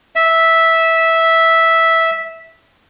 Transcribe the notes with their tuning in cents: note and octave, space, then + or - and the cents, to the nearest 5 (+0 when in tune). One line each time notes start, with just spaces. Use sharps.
E5 -10